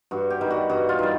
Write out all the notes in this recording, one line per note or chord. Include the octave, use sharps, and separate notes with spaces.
G2 F#4
G4
D#3 G3
F#4
G2 F#4
F4
D#3 G3